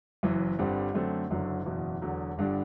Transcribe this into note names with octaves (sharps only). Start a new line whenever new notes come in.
F#1 F#2 E3
G1 G2 D3 G3 C4
F#2 D3 A3 C4
F#1 F#2 D3 F#3
F#1 E2 B2
E1 E2 D3 F#3
G1 G2 D3 G3 D4